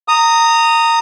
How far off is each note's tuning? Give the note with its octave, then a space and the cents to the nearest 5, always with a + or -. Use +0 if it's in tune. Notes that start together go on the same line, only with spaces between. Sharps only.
A#5 -20 D#6 +0